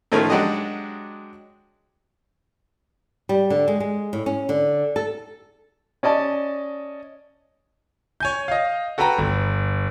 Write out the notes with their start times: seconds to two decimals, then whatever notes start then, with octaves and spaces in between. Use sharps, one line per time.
0.12 A2 D#3 F3 A3 C#4
0.30 F#3 G#3 D4 F#4 G4 D#5
3.29 G3
3.50 D3
3.68 G#3
3.80 G#3
4.13 A2
4.26 C#4
4.49 D3
4.96 A4
6.03 C#4 D5 D#5 A5
8.20 C#5 G#5 G6
8.48 D#5 F5
8.98 F#4 A4 B4 G5 A#5
9.18 G1